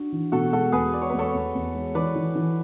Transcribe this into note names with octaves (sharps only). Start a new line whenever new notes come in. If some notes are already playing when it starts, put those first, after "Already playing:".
Already playing: D4 F#4
E3
B2 F#4 A4
G#3 F#4 A4
E2 G#4 B4
G#3 D5
C#5
E2 B4
A4 C#5
E2
E2
G#3
E3 B4 D5
E3
E3